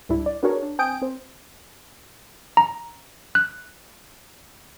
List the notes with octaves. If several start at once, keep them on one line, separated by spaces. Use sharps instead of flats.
C#2 A2 G3 D4 E4
D5
B3 D4 F#4 G#4 A#4 C#5
D4
C4 G5 G#5 D#6 G6 D7
C4 C5
A#5
F#6